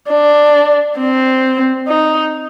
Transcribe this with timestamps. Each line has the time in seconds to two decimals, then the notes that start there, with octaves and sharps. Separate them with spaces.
0.09 D4
0.99 C4
1.88 D#4